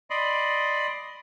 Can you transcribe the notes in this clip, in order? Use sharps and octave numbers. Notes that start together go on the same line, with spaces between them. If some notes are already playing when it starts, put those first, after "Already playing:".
D5 D#5 B5 C6